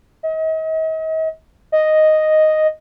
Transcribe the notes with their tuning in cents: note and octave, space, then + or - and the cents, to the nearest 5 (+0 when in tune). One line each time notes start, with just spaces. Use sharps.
D#5 +40
D#5 +0